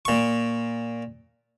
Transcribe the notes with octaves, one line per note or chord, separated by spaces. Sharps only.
A#2 C#6